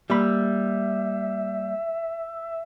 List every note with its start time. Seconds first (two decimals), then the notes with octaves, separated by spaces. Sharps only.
0.10 G3 A#3 E5 B5